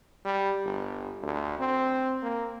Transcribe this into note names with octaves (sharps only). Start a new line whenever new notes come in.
G3
G1
D2
C4
A#3